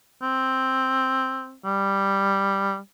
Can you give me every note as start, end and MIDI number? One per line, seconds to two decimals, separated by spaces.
0.22 1.55 60
1.65 2.78 55